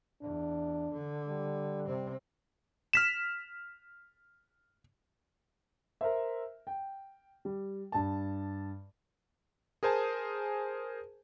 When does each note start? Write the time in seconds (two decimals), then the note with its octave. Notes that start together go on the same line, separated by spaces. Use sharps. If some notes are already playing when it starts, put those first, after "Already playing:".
0.22 E2 D4
0.93 D3
1.28 G3
1.86 C3 C4
2.93 F6 B6 E7
6.01 A#4 C5 E5
6.67 G5
7.45 G3
7.92 G2 A5
9.83 G#4 A#4 C5 G#5 A5